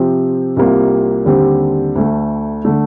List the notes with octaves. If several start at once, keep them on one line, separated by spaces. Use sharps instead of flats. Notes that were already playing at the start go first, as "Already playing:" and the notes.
Already playing: C3 F3 C4 G4
C2 C3 G3 A#3 F4
D#2 D3 G3 C4 G4
D2 D3 A3
D3 A3